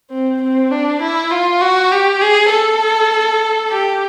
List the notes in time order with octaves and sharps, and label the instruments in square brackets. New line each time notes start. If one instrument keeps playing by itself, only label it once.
[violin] C4
C4
D4
E4
F4
F#4
G4
G#4
A4
G4